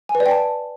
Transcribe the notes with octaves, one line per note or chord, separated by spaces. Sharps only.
G#5
B4
D5
G5
A5